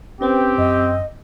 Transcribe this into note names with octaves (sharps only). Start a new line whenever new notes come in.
C4 C#4 G4 B4 C5
F#2 D#5